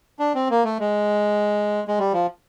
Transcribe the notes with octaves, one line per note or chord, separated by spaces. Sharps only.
D4
C4
A#3
A3
G#3
G#3
G3
F3